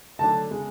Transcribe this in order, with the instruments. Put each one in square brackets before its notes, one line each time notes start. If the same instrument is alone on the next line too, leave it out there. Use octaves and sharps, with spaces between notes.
[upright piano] D3 F#3 A3 D4 [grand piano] A5
[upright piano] C#3 G#3 B3